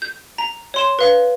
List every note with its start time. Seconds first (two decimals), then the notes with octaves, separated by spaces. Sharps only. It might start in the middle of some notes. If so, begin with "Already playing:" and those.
0.02 G6
0.38 A#5
0.74 C#5 C6 E7
0.99 B4 F5